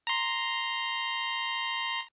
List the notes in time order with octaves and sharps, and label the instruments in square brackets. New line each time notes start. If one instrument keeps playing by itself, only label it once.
[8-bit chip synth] A#5 C6